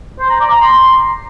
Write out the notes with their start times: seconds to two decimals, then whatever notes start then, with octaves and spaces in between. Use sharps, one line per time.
0.20 C5
0.30 A#5
0.40 D5
0.51 A#5
0.61 C6